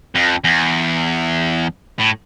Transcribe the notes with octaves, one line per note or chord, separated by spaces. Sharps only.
F2
E2
A2